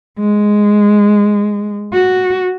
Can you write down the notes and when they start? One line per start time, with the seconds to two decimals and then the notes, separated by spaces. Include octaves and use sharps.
0.19 G#3
1.93 F#4